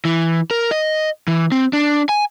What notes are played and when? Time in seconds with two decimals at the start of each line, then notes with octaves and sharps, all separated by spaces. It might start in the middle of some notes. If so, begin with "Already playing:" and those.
0.05 E3
0.51 A#4
0.71 D#5
1.28 E3
1.52 C4
1.73 D4
2.09 G#5